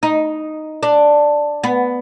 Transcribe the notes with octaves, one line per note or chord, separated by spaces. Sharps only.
D#4
D4
B3